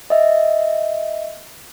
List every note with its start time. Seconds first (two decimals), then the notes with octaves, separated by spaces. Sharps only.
0.10 D#5 E5